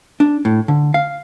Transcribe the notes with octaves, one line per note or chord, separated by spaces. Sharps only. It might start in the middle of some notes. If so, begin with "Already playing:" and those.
D4
A2
D3
F5